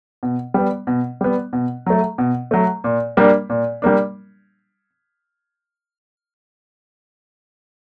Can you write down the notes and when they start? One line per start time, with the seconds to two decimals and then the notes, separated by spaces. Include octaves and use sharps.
0.23 B2
0.54 G3 B3
0.87 B2
1.21 G3 B3
1.53 B2
1.86 F#3 A3
2.18 B2
2.51 F#3 A3
2.84 A#2
3.17 G3 A#3 D4
3.50 A#2
3.82 G3 A#3 D4